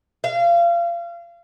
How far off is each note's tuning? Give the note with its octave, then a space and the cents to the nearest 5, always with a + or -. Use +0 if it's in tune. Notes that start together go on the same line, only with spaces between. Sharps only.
F5 -30